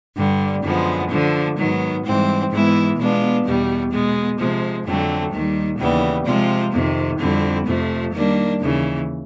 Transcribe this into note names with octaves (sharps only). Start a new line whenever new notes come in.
G2 D3 G3
F#2 D3 F3 G#3 B3
D3 F3 A3
G#2 D#3 F#3 B3
G#2 E3 G3 C4
G#2 E3 G#3 B3 E4
B2 G#3 B3 D4 F4
E2 B2 G3 B3
B2 G#3 B3
C3 F3 G#3
F2 D3 F#3 A3 C4
D#2 D#3 G3
D#2 C#3 E3 G3 B3
C3 F3 G#3 C4 F4
F2 C3 D#3
F2 D3 G3 C4 E4
F2 C3 F3 A3
D#3 G3 A#3 D4
D#2 C#3 E3